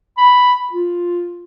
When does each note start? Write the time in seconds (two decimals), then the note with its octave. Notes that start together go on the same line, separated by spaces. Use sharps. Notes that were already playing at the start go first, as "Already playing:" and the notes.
0.17 B5
0.73 F4